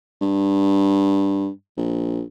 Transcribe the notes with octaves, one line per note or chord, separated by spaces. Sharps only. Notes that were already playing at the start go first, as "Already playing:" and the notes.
G2
A#1